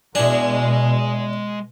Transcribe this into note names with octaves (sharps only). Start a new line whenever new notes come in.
E2 B2 G#3 D4 G#5